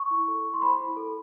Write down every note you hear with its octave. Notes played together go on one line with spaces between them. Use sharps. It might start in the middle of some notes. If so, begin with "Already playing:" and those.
Already playing: C#6
E4
A4
E4
C6
C5 B5
E4
A4